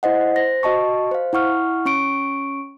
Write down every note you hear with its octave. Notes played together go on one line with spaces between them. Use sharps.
E4 C5 D#5 F#5
C5 A#6
F#4 D#5 A5 C#6
C5 F5
E4 F#5 C#6 F6
C#4 C#6 D7